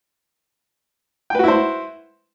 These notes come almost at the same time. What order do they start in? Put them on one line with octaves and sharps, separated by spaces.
G5 B4 F#4 E4 C5